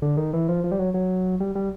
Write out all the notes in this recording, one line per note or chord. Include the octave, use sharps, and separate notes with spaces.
D3
D#3
E3
F3
F3
G3
F#3
F#3
G3
G3